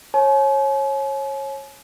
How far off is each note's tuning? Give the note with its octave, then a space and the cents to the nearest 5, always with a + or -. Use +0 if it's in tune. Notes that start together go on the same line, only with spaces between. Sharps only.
C#5 -25 G#5 +45